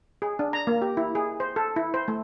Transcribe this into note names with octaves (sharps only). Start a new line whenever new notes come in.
G#4
D4
A#5
A#3
G4
E4
G#4
C5
A4
E4
C5
A3